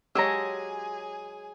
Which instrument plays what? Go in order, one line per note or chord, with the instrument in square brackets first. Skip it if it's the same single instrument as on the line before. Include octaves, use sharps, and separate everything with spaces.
[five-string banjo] F#3 G#3 [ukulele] G4 C#5 [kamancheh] G#4 G#5 [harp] A#5 E6